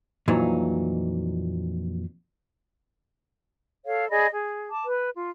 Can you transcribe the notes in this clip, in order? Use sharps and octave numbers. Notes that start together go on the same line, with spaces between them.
F2 A#2 E3 F#3 D#4
A4 C#5 F5
G#4 D5 D#5 B5
G#4
A5 D6
B4
F4